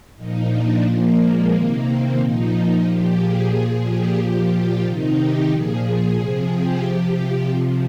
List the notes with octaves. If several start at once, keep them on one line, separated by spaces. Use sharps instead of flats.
A#2 F3 D#4
D4
A#2 F3 A#3
G#3
C3 D#3 A#3
C4
A#2 F3 D#4
A#2 F3 G4
G#4
A#2 F3
G4
A#2 F3 G4
F4
C3 D#3 D#4
G4
A#2 F3 G#4
C3 F3
G4
C3 F3 G4
C3 F3